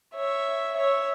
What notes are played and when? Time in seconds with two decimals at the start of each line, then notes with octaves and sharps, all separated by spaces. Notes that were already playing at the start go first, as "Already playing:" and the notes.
0.14 C#5 E5
0.76 C#5 E5